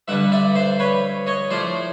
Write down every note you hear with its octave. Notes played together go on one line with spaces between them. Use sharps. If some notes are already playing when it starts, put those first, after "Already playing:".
G2 D3 G3 E5 F#5
D5 E5
C5 D5
B4 C#5
C#5 D#5
A2 F3 A3 C5 D5